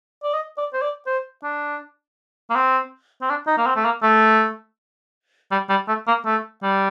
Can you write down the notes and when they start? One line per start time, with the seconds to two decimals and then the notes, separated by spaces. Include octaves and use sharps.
0.23 D5
0.33 D#5
0.58 D5
0.73 C5
0.82 D5
1.06 C5
1.43 D4
2.50 A#3
2.56 C4
3.22 C4
3.30 D4
3.47 D#4
3.58 A#3
3.66 C4
3.76 A3
3.85 A#3
4.03 A3
5.51 G3
5.69 G3
5.88 A3
6.07 A#3
6.25 A3
6.63 G3